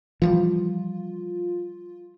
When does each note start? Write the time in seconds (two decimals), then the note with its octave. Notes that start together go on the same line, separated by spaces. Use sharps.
0.22 E3 F3 G3 F4